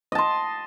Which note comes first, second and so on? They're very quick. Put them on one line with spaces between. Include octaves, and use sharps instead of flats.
D#5 A5 C6